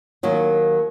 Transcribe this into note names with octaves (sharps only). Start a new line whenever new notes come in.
D#2 D#3 F#3 A#3